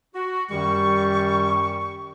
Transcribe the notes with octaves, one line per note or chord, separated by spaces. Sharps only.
F#4
F#2 D#3 G3 C#6